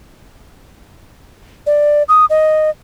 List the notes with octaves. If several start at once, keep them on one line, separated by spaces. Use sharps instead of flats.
D5
D#6
D#5